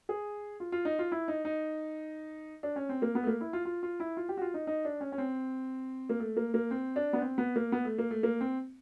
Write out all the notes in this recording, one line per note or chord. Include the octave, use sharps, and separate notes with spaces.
G#4
F4
F4
D#4
F4
E4
D#4
D#4
D4
C#4
C4
A#3
B3
A3
A#3
E4
F4
F4
F4
E4
F4
G4
F#4
F4
D#4
D#4
D4
C#4
C#4
C4
A#3
A3
A#3
A#3
C4
D4
B3
C4
B3
A#3
B3
A3
A#3
A3
A#3
C4